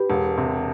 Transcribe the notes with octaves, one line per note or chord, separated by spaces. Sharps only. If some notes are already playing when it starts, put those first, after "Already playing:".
Already playing: G4 B4
E1
C3